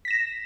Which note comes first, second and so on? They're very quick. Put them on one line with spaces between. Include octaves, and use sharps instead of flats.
B6 A#6 E7